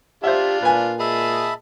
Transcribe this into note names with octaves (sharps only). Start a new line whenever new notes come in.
D4 F4 G4 C5 E5
A#2 B4 G#5
G#4 D#5 E5 A5 B5